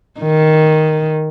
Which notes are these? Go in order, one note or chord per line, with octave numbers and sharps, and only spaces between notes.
D#3